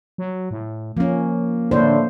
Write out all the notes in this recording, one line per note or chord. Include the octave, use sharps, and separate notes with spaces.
F#3
A2
F3 A#3 C#4
A2 D3 A#3 D4 C5